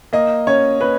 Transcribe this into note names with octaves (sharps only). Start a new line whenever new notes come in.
A#3 D#5
C#4 C#5
C#4 B4